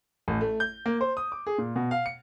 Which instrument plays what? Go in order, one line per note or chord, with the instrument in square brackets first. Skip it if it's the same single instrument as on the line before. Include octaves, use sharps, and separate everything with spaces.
[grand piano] A1
A3
G6
A#3
C5
D#6
D6
G#4
A#2
B2
F5
C#7